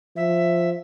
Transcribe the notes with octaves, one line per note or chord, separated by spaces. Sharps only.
F3 E5